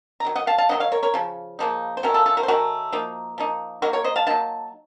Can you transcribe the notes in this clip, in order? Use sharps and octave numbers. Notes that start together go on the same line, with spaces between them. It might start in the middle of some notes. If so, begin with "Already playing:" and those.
A#5
D#3 F#3
D#5 F#5
F5 A5
F5 A5
D#3 F#3 C4 D#4 D#5 F#5
C#5 F5
A#4 C#5
A#4 C#5
C#3 F3
C#3 F3 A#3 D#4
C5
D#3 A3 C#4 F#4 A#4
F4 A4
F4 A4
F#4 A#4
C5
D#3 A3 C#4 F#4 A#4
F3 A#3 D#4
F3 A#3 D#4
F#3 A#3 D#4 F#4 A#4
A#4 C#5
C5 D#5
F5 A5
F#3 A#3 D#4 F5 A5